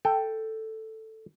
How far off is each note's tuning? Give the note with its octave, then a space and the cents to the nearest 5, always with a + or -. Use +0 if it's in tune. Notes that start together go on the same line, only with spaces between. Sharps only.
A4 +5 G5 +0